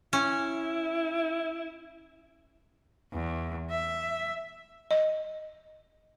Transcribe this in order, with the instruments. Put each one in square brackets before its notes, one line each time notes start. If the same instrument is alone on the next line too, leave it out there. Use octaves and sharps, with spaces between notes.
[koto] C#4 [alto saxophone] E4
[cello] E2
E5
[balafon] D#5